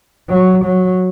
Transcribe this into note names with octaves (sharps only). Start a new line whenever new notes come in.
F#3
F#3